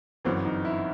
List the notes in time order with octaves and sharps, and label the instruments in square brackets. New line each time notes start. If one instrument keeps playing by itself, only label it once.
[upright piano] G1 F#2 E3 [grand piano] C4
[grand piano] D#4
E4